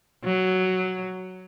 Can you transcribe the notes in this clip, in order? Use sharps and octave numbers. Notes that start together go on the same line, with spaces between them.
F#3